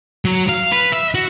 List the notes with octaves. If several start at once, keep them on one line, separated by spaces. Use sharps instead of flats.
F#3
F5
B4
E5
F#4